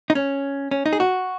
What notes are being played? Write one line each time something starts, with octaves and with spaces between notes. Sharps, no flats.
D#4
C#4
C#4
D#4
G#4
F#4